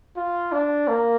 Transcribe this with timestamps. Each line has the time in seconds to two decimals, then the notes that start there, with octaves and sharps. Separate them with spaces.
0.16 F4
0.52 D4
0.88 A#3